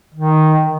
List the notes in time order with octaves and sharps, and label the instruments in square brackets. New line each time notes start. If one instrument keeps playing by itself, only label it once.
[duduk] D#3